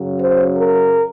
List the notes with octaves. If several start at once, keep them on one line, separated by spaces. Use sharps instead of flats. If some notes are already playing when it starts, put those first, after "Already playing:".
Already playing: F#2 C#3 F#3
C5
A#4